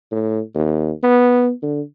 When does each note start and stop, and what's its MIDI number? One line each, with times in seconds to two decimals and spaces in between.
0.11 0.40 45
0.55 0.91 39
1.03 1.51 59
1.62 1.81 50